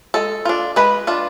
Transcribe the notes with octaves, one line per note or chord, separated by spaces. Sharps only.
G#3 A4
D4 F4
G#3 B4
D4 F4